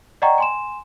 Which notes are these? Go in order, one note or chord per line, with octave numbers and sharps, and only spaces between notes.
D5 D#5 F#5 G5 A#5 C#6
G#5 C6 E7